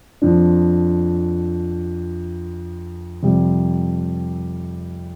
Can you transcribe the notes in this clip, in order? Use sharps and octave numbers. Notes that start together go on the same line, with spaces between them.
F2 F3 D4
F2 C3 G3